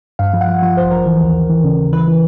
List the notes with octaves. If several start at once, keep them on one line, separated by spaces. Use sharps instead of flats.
G2 F5
F3
F#5
F3
F3 F#5
A1 C5
F3 A#4
E3
D#2
D#2
E3
C#3
D#2
E3 B4
E3